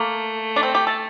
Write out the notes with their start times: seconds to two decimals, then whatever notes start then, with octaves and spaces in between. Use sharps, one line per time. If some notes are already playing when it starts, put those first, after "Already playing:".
Already playing: A3 A#3
0.56 D4
0.63 C4
0.75 G4
0.87 A4